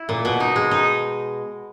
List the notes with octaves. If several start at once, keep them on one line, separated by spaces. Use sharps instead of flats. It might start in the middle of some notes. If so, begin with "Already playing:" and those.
Already playing: E4
A#2
B2
D#4
G#3
D#4